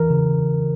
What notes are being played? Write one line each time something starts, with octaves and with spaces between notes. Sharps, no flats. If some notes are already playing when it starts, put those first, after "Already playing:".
Already playing: E3 A#4
C#3